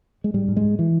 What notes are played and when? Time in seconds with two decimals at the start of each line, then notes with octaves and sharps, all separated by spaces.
0.24 G#3
0.34 G#2 G3
0.48 G#2
0.57 G#3
0.64 G#2
0.79 E3